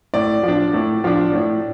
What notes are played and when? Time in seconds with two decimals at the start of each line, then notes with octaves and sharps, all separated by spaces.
0.14 A2 D5
0.43 F3 D4
0.73 A2
1.04 F3 D4
1.33 A2